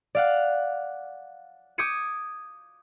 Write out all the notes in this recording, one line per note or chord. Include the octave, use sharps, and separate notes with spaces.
D5 F5 F#5
D6 D#6 G6 G#6 C#7 D#7